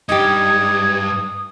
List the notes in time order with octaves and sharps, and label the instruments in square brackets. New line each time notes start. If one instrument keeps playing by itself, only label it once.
[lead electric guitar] G2 [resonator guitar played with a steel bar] D#4 G4 [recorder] D#6 [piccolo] G#6